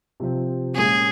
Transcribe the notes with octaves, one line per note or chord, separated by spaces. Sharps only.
C3 F3 C4
A#2 G#3 C#4 F4 G#4